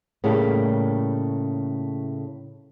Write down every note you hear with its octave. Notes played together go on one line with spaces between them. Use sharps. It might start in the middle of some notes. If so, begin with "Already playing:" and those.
A2 C#3 G3 A3 A#3